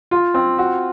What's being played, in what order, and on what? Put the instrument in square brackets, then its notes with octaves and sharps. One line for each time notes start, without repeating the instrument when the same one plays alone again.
[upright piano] F4
C4
F#4